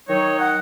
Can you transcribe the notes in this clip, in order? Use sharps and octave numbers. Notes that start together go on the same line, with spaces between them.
D#3 F#3 D#4 C#5
F#5